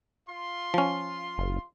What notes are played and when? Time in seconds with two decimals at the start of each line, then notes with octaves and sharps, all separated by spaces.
0.29 F4 C6
0.74 F3 C#4
1.38 F#1